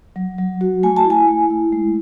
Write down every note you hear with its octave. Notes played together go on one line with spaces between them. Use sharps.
F#3
F#3
F#4
A3 G#5
A5
E4
G#5
A3
E4
G#3